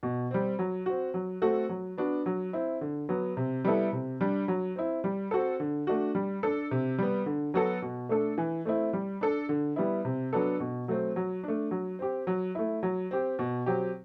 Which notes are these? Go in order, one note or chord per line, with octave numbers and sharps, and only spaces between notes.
B2
G3 C4
F#3
C4 F#4
F#3
A3 C4 F#4 A4
F#3
B3 D4 F#4
F#3
C4 E4
D3
F#3 B3
C3
G3 B3 E4 A4
C3
G3 D4
F#3
C4 E4
G3
C4 F#4 A4
D3
A3 D4 F#4
G3
D4 A4
C3
G3 B3
D3
F#3 B3 F#4 A4
B2
A3 D4 A4
E3
A3 C4 E4
G3
D4 A4
D3
G3 B3 E4
C3
F#3 B3 D4 A4
B2
F#3 A3 C4
F#3
A3 D4
F#3
C4 G4
F#3
A3 E4
F#3
C4 G4
B2
F#3 C4 G4